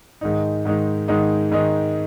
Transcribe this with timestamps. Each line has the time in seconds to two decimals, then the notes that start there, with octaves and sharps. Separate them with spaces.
0.21 G#2 D#3 G#3 D#4
0.65 G#2 D#3 G#3 D#4
1.08 G#2 D#3 G#3 D#4
1.51 G#2 D#3 G#3 D#4